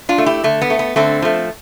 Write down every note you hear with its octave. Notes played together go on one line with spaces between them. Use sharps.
D4 F4
A3
E4 G4
D3 A3
B3
A3
B3
D3 A3 C4
F3 A3